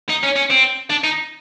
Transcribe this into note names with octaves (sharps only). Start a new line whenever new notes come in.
D#4
C#4
C#4
C4
D4
D#4